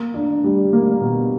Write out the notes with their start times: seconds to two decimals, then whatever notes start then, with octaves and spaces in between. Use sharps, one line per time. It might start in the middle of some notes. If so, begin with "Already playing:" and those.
Already playing: A#3
0.14 D4
0.44 G3
0.73 A#3
1.01 B2